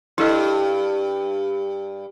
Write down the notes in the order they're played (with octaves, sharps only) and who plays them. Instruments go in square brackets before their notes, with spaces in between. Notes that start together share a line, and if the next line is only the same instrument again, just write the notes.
[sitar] G2 [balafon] E4 A4 D#5